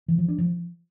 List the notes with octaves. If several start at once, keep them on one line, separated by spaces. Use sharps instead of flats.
E3
F3
D4
F3